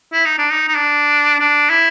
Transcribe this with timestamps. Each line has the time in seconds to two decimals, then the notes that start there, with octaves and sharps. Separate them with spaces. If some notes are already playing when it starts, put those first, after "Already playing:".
0.13 E4
0.25 D#4
0.38 D4
0.52 D#4
0.68 D#4
0.75 D4
1.39 D4
1.70 E4